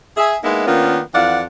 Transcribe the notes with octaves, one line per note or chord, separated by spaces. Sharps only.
G#4 E5
G#3 A#3 B3 D#4 E4
D#3 A#3 B3 C#4 D4 F4
F2 E3 D5 F5 F#5